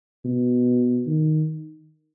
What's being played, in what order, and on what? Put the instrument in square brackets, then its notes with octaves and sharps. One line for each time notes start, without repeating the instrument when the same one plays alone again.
[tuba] B2
D#3